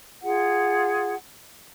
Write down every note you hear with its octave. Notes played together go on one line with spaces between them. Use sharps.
F4 G#4 F#5